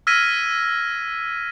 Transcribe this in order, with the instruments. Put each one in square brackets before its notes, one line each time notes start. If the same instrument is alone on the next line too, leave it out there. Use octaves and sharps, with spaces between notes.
[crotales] E6 F6 G#6 A#6 B6 D#7